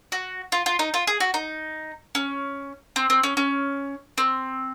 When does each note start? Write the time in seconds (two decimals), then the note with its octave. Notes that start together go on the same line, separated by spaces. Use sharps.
0.12 F#4
0.52 F4
0.66 F4
0.79 D#4
0.94 F4
1.07 G#4
1.20 F#4
1.34 D#4
2.15 C#4
2.96 C4
3.10 C4
3.23 C#4
3.37 C#4
4.18 C4